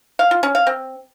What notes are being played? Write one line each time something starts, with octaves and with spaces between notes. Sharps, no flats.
F5
F4
C#4
F5
C4